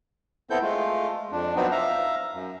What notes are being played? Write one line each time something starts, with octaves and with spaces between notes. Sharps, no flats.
B3 C4 E4 A4 G6
G#3 A3 F4
F2 D4
F3 F#3 B3 C4 D4 D#4
E5 F5 A#5
F#2